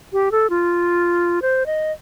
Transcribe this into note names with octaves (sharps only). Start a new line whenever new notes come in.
G4
A4
F4
C5
D#5